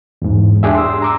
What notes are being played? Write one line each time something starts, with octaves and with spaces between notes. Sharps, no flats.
E2 G#2
D4 G4 G#4 E5
C6 E6
A#5 D6 E6